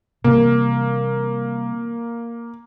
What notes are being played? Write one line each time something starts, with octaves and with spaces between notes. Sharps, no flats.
C3 E3 G3 A#3